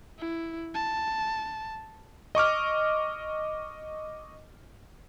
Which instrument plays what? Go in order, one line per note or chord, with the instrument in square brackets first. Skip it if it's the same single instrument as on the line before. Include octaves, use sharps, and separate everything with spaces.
[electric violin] E4
A5
[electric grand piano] D#5 C#6 D6 F6